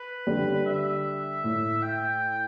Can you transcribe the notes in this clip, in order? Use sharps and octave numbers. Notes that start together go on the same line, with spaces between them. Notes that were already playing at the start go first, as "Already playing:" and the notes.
Already playing: B4
D3 G3
E5
A2
G5